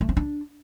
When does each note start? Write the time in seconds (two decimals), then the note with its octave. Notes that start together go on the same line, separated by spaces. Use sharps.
0.01 A3
0.09 C4
0.17 D4